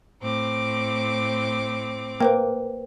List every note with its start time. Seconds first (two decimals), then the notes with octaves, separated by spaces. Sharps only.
0.22 A2 C4 D6
2.21 A#3 B4 C5 G5